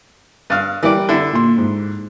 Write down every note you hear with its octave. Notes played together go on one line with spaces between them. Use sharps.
G2 F5
E3 G3 G4 A#4 D5
D3 E4
A#2 C6
G#2